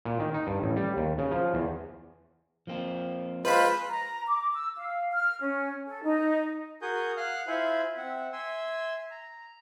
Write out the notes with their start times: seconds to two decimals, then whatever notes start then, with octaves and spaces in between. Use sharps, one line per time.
0.05 A#2
0.19 D#3
0.34 D#4
0.47 G2
0.62 A1
0.76 G3
0.97 D#2
1.18 C#3
1.31 F3
1.54 E2
2.67 F3 A#3 C4
3.45 G#3 F4 B4 C5 B5
3.90 A#5
4.27 D6
4.53 E6
4.77 F5
5.12 F6
5.41 C#4
5.87 A4
6.03 D#4
6.82 F#4 G#4 A#4 G#5 D#6 G6
7.17 F5 F#5 F6 F#6
7.47 E4 F4 C5 E5 G#5 B5
7.97 C4 E5 F#5
8.33 E5 G#5 C6 E6
9.11 A#5